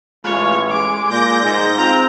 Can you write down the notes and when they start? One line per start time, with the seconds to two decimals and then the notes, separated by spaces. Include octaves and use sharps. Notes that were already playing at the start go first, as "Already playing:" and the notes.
0.24 A1 G#3 F4 C#5
0.70 G#3 D6
1.10 A#2 G6 A#6
1.42 G#2
1.78 C4 F4 A#5